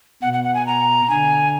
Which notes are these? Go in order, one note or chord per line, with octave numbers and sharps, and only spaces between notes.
B2 F#5
F#5
F#5
G#5
A#5
D3 G#5